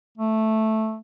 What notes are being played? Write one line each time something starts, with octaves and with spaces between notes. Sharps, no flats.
A3